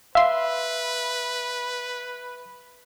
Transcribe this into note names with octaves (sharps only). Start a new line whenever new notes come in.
B4 E5 F5 C6